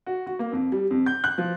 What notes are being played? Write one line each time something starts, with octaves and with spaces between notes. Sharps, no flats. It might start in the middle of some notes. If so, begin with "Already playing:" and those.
F#4
F#4
A#3
F2
G3
F2
G6
F#6
F3